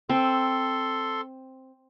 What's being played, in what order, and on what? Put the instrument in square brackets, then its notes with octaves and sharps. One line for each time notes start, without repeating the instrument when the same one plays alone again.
[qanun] C4 [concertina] A4 C6